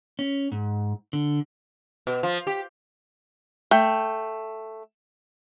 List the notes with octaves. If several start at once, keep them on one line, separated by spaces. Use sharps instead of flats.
C#4
G#2
D3
B2
F3
G4
A3 G5